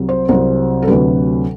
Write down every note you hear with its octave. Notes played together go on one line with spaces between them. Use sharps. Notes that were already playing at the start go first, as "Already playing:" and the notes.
Already playing: C2 C3 F#3
C5
C2 C3 F#3 C5
A4
D2 C3 F#3 B4